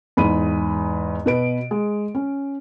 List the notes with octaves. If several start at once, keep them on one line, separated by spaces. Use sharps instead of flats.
E2 G#2 B5 D#7
B2 B4 D7
G#3
C#4